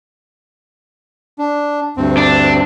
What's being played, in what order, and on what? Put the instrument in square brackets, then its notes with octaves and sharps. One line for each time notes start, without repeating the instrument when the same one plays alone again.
[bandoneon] D4
D2 G2 C4
[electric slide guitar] D4